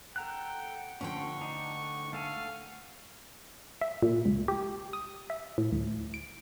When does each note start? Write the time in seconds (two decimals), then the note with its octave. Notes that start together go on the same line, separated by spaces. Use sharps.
0.16 A4 F#5 G5 A#5 F#6
1.01 D2 D3 C#4 F4 G5 C#6
1.41 D4 D#4
2.13 A3 A4 F5 G#5
3.81 E5
4.03 A#2
4.26 C#2
4.48 G4
4.93 D#6
5.30 E5
5.58 A2
5.72 D2
6.14 D7